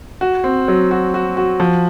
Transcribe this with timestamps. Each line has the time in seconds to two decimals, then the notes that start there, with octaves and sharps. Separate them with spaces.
0.21 F#4
0.44 C4
0.68 F#3
0.91 F#4
1.14 F#4
1.37 F#4
1.60 F3